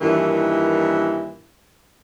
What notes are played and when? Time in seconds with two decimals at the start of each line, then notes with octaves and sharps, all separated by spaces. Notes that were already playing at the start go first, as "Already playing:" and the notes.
0.01 G2 A#2 D#3 E3